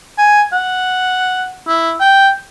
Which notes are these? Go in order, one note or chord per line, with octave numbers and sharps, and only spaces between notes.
G#5
F#5
E4
G5